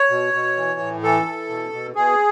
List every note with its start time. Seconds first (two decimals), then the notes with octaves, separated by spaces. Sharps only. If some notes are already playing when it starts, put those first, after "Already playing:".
Already playing: C#5
0.10 B2
0.34 B2
0.57 E3
0.80 A2
1.03 E3 A4
1.26 E3
1.49 B2
1.73 B2
1.95 B2 G#4